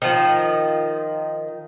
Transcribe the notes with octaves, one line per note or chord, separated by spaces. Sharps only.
D#3 F3